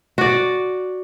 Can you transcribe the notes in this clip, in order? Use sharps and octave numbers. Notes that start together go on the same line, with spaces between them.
F#4 D5